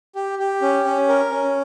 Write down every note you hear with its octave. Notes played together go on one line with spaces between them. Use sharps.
G4
G4
C#4
C#4
A#4
C#4